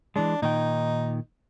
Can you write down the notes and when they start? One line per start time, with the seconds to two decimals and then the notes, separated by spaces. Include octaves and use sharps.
0.16 E3 G#3 D4
0.42 A#2 D#3 D#4 G5